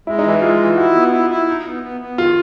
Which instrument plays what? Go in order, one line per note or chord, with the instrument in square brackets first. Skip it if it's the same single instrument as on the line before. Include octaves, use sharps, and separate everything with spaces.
[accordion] G#3 [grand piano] E4
[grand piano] D#4
[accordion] E3 [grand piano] E4
[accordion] G#3 [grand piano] F4
[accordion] E3
[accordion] E4 [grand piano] F#4
[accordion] B3
E4
E4
D#4
B3
B3
B3
[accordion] D#3 [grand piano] F4